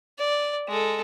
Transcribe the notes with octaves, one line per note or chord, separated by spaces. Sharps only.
D5
G#3 A4